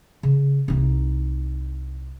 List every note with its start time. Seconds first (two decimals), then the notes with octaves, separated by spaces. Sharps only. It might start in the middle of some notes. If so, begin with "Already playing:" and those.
0.23 C#3
0.68 C2 D#4